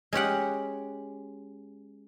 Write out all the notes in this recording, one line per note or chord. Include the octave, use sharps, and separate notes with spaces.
G#3 C#4 G4 F#5